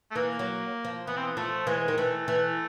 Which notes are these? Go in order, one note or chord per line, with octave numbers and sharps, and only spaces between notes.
A3
E3 A#3
F#3
F3
E3 B3
C4
B3
F3 A3
E3 G#3
D#3
E3 A3
E3